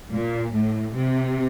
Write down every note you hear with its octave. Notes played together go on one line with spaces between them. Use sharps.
A#2
A2
C3